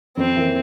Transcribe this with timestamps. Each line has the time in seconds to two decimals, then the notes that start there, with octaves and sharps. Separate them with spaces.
0.17 F2 C4
0.36 E3 A#3